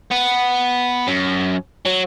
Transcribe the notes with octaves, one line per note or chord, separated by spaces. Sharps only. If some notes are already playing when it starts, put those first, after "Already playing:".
B3
F#2
F#3